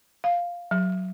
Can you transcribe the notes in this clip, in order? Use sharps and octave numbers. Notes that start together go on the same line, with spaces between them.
F5
F#3